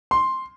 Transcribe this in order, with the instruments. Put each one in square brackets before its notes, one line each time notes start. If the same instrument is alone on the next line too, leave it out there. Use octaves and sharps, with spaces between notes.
[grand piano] C6